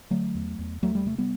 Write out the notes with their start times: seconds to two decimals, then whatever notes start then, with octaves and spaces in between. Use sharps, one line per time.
0.10 D3 F#3 A3
0.35 E2
0.59 E2
0.82 E2 F#3 A3
0.95 G3
1.06 C3 A3
1.18 G3 B3